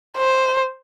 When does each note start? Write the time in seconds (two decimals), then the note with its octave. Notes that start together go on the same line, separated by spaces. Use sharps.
0.18 C5